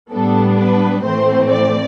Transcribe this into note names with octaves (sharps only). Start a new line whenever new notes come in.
A2 G3 B3 D4 A4
B4
A2 E3 A3 C4 C5
D5